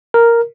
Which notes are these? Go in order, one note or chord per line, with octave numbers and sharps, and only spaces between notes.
A#4